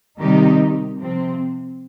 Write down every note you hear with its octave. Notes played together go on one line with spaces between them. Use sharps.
C3 D#3 G3 D#4 G4
C3 F3 C4